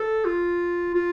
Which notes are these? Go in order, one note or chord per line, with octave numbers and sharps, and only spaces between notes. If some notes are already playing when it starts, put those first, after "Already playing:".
Already playing: A4
F4
F4